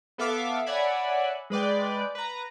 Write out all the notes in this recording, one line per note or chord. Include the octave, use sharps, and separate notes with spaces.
B3 A4 E5 F5 D6 E6
C#5 D5 E5 F#5 G#5 B5
G#3 B4 D5 G5
B4 A#5